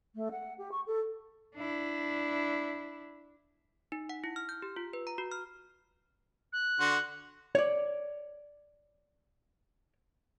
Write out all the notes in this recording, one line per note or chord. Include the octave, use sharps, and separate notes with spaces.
A3
F#5
G4
C#6
A4
D4 E4
D#4
F#5
E4
F6
G6
G4
F4
B4
A#5
F#4
F6
F#6
D3 F#4 C6
C#5 D5